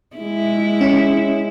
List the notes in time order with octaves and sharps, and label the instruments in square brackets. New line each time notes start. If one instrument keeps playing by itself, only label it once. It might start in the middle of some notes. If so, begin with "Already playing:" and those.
[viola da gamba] G#3 E4
[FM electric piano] C#4